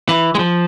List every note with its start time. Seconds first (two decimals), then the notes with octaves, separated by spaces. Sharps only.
0.09 E3
0.35 G#3
0.39 F3